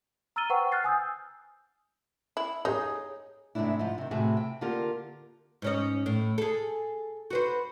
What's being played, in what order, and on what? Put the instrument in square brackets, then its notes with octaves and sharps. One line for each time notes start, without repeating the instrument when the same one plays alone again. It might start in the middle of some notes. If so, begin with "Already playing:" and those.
[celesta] A#5 E6 F6 A6 D#7 G7
B4 C5 F#5 G5 A#5 C#6
F6 F#6 A6 C7
G#5 D#6 E6 G6
[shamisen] E4
[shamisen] D#4 [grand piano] G#4 C#5
[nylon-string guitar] G#2 C3 G#3 A3 D4 E4
G#2 F3
C3 D#3
A2 C3 E3 F#4 G#4
G5
D3 A#3 F4 G4 A#4
[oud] G#2 C#4 D#5
A2
G#4 A4
F#4 B4 C5